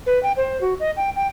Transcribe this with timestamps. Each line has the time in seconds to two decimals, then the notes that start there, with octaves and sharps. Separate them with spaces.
0.06 B4
0.23 G5
0.37 C5
0.61 F#4
0.80 D#5
0.97 G5
1.16 G5